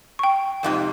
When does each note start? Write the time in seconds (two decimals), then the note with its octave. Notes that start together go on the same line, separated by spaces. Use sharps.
0.19 G5 C#6
0.63 F2 G#2 C3